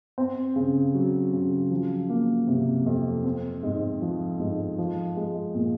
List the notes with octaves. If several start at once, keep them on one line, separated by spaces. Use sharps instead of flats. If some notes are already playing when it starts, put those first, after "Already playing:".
C4
C#3
F#3
C#3
F3
A#3
C3
F2
C4
G#2
F3
G#2
F3
G#3
A#2